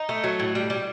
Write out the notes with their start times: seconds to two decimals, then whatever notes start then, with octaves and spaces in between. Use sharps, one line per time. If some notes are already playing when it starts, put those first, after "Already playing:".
Already playing: D#4
0.09 A3
0.24 F#3
0.39 A2
0.55 G3
0.70 G3